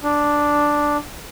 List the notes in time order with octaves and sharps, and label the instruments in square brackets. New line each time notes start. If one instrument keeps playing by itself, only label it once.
[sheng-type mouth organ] D4